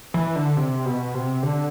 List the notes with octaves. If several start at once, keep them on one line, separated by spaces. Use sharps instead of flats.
E3
D3
C3
B2
C3
D3